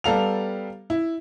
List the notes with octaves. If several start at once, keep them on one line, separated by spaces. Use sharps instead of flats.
G3 B3 A4 F5 A#5 F7
E4